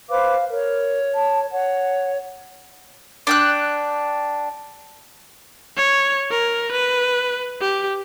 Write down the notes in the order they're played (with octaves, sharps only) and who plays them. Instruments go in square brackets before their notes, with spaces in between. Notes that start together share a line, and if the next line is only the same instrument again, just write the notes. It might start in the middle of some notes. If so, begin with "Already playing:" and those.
[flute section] B4 C5 D6 [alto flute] F5
[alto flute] A#4 [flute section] C#5
[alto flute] A5
[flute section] C#5 [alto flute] F#5
[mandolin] D4 G5 F#6
[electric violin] C#5
A#4
B4
G4